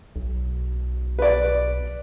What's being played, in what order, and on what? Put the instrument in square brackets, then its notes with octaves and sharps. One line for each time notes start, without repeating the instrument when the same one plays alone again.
[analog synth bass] B1
[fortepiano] B4 D5